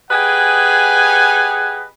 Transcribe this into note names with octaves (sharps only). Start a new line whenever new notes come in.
G4 G#4 B4 D#5 F#5 G#5